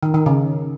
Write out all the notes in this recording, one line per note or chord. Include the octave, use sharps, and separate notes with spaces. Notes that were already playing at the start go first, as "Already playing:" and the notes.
D#3
D#3
C#3